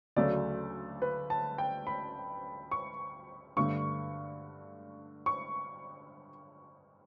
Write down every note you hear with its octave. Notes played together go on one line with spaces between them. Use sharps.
D2 C#3 F#3 A3 D5
B4
A5
G5
B5
C#6
G2 D3 A3 C#6
C#6